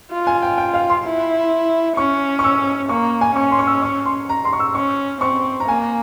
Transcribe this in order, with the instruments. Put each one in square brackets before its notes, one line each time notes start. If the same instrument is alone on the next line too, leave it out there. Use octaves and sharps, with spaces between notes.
[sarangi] F4
[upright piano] G#5
G5
G5
F5
C6
[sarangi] E4
[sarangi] C#4 [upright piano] C#6
[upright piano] C#6
E6
[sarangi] A#3 [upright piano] C#6
[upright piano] G#5
[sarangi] C#4 [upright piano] C#6
[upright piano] C6
C#6
E6
C#6
C6
A#5
C6
C#6
E6
[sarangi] C#4 [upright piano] C#6
[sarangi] C4 [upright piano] C#6
[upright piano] A#5
[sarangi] A#3 [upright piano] G#5